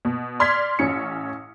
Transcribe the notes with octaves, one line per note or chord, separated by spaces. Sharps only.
B2
D5 C6 F6 G#6 B6
A1 C#4 C#7